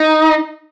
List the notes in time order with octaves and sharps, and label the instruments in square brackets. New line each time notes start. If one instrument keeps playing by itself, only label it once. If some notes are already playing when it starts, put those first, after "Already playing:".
Already playing: [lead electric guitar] D#4